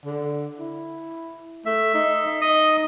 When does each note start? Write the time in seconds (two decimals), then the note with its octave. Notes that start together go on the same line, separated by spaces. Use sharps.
0.06 D3
0.59 E4
1.66 A3 E5
1.94 D#4
2.41 D#5